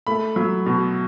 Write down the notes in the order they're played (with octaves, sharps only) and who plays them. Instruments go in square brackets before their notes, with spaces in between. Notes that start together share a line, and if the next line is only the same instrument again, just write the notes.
[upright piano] A3 B5
F#3
B2